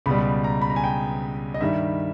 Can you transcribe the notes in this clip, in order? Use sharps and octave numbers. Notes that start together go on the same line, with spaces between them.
C#2 B2 G3 B5
A#5
B5
A#5
G#5
G5
D#5
G2 D#3 G3 E5